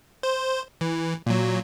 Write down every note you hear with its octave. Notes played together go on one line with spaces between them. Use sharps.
C5
E3
A#2 F#3